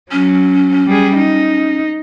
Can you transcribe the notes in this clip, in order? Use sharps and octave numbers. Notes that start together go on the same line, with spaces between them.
F#3 C#4
G3 G#4
D#4